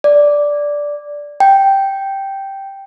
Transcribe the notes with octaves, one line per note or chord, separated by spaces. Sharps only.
D5
G5